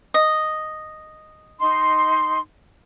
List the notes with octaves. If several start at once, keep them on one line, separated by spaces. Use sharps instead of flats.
D#5
D#4 C6